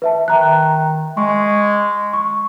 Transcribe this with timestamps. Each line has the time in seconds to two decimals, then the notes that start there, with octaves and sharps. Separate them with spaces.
0.02 B4 E5 A5
0.28 D#3 E5 A#5 F#6
1.17 G#3 C#6
2.13 C#6